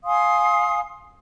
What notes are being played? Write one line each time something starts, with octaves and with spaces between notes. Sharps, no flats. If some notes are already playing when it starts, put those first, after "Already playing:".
F5 G#5 C6 D#6